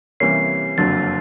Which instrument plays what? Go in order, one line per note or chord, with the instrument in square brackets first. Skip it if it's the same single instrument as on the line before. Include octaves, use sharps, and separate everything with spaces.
[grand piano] C3 E3 G3 A#3 C#4 [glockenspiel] C7
[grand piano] F#1 F2 D3 F#3 [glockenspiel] A6